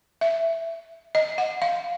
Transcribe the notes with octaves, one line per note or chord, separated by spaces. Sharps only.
E5
D#5
F#5
F5